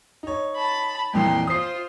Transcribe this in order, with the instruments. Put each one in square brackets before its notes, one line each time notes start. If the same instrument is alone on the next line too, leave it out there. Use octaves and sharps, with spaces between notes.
[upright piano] D#4 C#5
[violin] A5 B5
[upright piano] F2 A#2 E3 [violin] G5 C6
[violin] F4 C5 [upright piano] D#6 C7